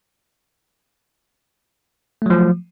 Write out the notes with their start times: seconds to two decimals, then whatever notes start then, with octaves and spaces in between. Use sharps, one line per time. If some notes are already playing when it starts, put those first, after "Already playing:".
2.22 A3
2.26 F#3
2.30 F3